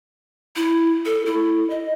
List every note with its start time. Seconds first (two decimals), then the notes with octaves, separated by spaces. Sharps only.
0.56 E4
1.05 A4
1.26 E4
1.70 D#5